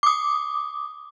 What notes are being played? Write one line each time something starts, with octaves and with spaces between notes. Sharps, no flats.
D6 D#6